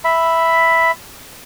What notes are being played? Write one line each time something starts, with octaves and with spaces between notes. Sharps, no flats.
E5 B5